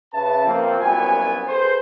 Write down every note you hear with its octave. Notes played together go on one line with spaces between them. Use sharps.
C#3 B4 E5 A5
F2 F3 A#3 C4
C2 F#2 A#2 F#3 B3 G#5
G#4 A4 B4 C5